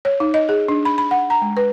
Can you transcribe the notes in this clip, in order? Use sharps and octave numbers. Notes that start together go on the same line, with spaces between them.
C#5
D#4
D#5
G#4
D4
B5
B5
F#5
A#5
G#3
B4